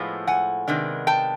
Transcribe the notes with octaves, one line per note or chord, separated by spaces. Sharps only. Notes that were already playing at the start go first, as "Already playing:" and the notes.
Already playing: A2 F3 G#3 B3
F#5 G#5
C3 D#3 G#3 B3 D4
G5 A5